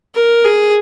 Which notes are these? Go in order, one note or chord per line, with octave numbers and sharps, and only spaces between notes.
A#4
G#4